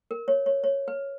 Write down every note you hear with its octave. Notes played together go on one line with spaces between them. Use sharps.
A#4
C#5
C#5
C#5
B4